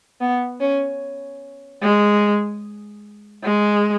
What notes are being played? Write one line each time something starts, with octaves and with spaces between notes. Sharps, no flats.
B3
C#4
G#3
G#3